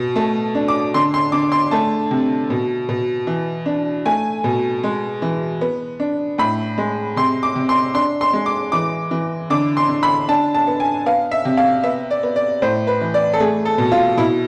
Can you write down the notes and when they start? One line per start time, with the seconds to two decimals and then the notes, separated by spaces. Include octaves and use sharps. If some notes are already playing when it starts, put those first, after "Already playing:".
Already playing: B2
0.16 A3 A5
0.55 D4
0.68 D6
0.94 D3 C6
1.14 C6
1.32 D3 D6
1.52 C6
1.71 A3 A5
2.11 C3
2.50 B2
2.89 B2
3.27 E3
3.66 D4
4.05 A3 G#5
4.44 B2
4.84 G#3
5.22 E3
5.61 B3
6.00 D4
6.38 A2 B5
6.78 G#3
7.16 C3 C6
7.43 D6
7.56 C3
7.69 C6
7.94 D4 C6
8.21 C6
8.33 G#3
8.46 D6
8.72 E3 D6
9.11 E3
9.50 D3 D6
9.77 C6
9.89 D3
10.03 B5
10.28 D4 A5
10.54 A5
10.67 B3
10.80 G#5
11.06 B3 F5
11.31 E5
11.45 C3
11.57 F5
11.84 B3 E5
12.11 D5
12.23 B3
12.36 D5
12.62 A2 C5
12.87 B4
13.01 E3
13.14 D5
13.34 A4
13.40 A3 G#4
13.65 A4
13.78 B2
13.92 F4
14.17 B2 E4